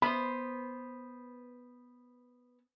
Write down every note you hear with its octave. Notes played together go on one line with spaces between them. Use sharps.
B3 C5 B5